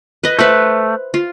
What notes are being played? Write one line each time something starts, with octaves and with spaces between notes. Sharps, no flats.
B4 D#5
A3 B4 C5 E5
F4